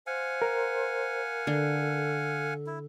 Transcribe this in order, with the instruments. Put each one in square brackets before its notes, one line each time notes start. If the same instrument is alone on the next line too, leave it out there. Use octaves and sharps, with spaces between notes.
[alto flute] C5 [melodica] F5 F#5 G#5
[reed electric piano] A#4
[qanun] D3 [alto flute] A4
[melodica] E4